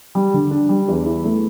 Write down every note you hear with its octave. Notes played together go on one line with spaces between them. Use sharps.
G3
D3
D4
G3
E2
E4
A3